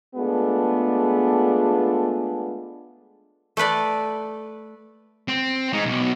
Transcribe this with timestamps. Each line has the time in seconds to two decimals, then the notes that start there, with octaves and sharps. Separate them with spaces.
0.16 G#3 A3 B3 D4 F4 G#4
3.57 A3 A4 B4 D5
5.28 C4
5.73 G#3 D#4
5.85 B1